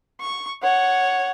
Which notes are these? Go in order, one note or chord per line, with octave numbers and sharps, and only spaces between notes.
C#6
C#5 F#5